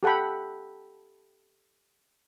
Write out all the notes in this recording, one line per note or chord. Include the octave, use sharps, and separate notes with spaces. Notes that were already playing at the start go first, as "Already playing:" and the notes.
G4 A4 F#5 G5 B5